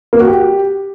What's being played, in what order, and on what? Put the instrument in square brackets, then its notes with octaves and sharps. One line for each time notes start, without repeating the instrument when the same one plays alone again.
[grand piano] A#3
F#4
G4